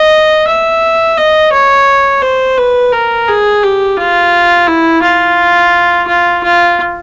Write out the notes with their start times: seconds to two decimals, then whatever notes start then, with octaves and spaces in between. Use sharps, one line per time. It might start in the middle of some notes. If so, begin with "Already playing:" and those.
Already playing: D#5
0.47 E5
1.18 D#5
1.52 C#5
2.22 C5
2.57 B4
2.92 A#4
3.28 G#4
3.63 G4
3.97 F4
4.67 E4
5.02 F4
6.07 F4
6.44 F4